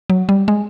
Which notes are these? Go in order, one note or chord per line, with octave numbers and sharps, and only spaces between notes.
F#3
G3
G#3